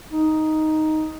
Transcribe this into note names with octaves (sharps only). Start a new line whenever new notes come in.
D#4